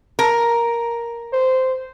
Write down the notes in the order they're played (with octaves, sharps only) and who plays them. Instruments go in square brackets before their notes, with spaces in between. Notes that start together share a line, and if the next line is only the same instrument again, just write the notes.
[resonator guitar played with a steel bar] A#4
[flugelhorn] C5